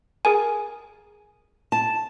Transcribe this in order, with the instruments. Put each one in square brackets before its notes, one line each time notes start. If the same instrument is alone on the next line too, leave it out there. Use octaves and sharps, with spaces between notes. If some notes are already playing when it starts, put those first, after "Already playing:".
[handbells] G#4 A#4 G#5
[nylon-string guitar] A5